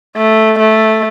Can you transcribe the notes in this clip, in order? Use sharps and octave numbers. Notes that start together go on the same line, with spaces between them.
A3
A3